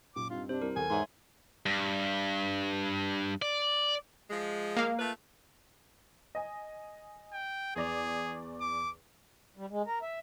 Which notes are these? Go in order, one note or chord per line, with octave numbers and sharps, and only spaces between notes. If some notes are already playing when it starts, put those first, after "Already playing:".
F#2 A#2 D6
G2 C4 D#4 F4
C3 D4 C5
C2 A#4
E2 A4 G#5
G#2 C#5 E5 C6
G2
D5
F3 G#3
A#3 F5
A3 F4 B4
D#5 G#5
G5
E2 G#4 D5 F7
D6
G3
G#3
A#4
E5